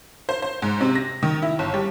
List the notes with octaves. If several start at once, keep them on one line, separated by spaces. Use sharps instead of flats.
C5
C5
G#2
C3
A#6
D#3
E4
G1
G3